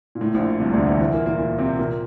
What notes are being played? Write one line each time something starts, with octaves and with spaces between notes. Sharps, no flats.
A#2
A2
A#1 A#2
C2 C3
D2 D3
E2 E3
E2 E3
A#2 A#3
A#2 A#3
A#2 A#3
C3 C4
A#2 A#3